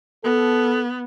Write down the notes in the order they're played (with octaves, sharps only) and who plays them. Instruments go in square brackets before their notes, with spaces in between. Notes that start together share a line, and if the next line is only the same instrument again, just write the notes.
[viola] B3 [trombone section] A4